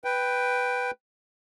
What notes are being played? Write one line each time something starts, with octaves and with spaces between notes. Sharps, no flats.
B4 G5